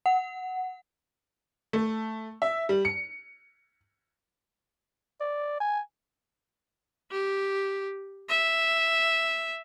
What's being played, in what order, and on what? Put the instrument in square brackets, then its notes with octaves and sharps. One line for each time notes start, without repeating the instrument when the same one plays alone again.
[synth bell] F#5
[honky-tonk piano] A3
E5
G3
C#7
[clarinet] D5
G#5
[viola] G4
E5